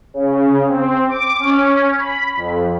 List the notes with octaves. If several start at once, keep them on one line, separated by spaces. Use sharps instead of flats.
C#3
C4
D6
C#4
B5
F2